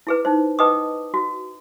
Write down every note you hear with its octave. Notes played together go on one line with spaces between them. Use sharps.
E4 G#4 B4
D#4 C5
B4 D#5 G5 A5 D6 D#6
F#4